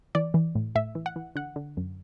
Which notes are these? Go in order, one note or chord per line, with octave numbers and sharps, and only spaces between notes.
E3 D5
E3
A2
A2 E5
E3
F#5
E3
D3 F#5
D3
F#2